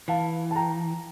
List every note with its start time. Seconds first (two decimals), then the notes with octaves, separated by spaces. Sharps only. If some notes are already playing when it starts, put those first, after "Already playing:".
0.08 E3 F5 A5
0.51 A5
0.55 G5 A#5